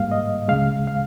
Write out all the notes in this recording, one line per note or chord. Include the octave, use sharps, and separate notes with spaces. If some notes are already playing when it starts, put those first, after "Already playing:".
Already playing: G#2 G3 A#3 F5
D#5
C#2 C#3 G#3 F5
F5